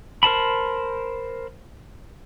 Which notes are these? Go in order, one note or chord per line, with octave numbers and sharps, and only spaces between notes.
A#4 C5 A5 B5